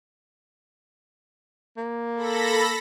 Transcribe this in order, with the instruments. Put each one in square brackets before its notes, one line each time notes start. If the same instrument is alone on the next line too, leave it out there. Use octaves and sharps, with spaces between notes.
[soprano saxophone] A#3
[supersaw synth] A4 B5 A#6